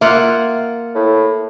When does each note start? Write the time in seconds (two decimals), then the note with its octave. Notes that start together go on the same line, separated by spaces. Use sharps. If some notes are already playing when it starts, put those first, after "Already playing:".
0.01 A#3 F4 E5 F#5
0.95 A2